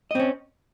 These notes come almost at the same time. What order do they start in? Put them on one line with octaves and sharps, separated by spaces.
D#5 C4 C#4